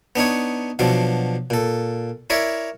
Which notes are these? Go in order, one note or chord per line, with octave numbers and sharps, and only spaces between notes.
B3 D4 D#4 C#5
B2 F3 F#3 D4
A#2 A4
E4 A#4 C#5 D5 E5